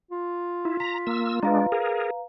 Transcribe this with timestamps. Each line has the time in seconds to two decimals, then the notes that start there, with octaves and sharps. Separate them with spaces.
0.11 F4
0.65 E4
0.80 A#5 B6
1.07 A#3 E6
1.43 G#3 D4 B4 F5 A#5
1.72 G#4 A#4